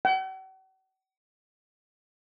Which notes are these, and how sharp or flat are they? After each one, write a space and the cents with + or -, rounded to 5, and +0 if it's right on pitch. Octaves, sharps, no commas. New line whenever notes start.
F#5 +45